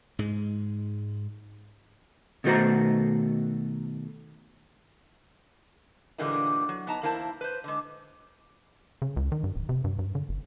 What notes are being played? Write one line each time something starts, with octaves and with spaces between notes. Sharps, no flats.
G#2 G#3
B2 D#3 A3 F#4 C5 A#5
A#2 D3 E3 G3 G#3 A#3
F#3
B3 D#4 A5 A#5
E2 A#3 E4 C5 G#5 A5
B4 C5
D3 G#3
C#3
C#2
D#3
G2
D1
C3
G2
G2
D3
G1